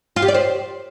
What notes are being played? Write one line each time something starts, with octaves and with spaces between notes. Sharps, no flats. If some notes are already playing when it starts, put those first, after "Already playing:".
F4
G4
D5
C5